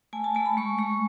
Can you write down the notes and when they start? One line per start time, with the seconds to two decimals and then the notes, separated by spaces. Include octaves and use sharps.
0.13 A3 G#5
0.24 A5
0.35 A3 A5
0.46 B5
0.57 G#3 C#6
0.78 G#3 C#6